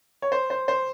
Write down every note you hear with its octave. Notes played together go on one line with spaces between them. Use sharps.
C#5
C5
C5
C5